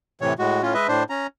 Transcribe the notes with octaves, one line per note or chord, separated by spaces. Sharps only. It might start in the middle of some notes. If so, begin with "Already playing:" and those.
A2 C3 E3 C#5
A2 G#3 F#4
A2 C#4 F4
G#3 B4 D#5 E5
A2 D4 C5
C#4 A#5